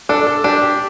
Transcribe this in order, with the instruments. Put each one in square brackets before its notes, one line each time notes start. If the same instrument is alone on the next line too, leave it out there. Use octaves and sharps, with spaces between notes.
[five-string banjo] D4 [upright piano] A4
[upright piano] A4
[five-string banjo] D4 [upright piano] G4
[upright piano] G4